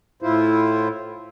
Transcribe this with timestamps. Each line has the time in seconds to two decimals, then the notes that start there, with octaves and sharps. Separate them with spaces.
0.22 A2 E4 F4 C5